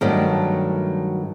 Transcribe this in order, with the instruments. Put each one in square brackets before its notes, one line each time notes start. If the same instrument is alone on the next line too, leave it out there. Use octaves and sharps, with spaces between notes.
[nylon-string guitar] G2 D#3 F#3 A3 D4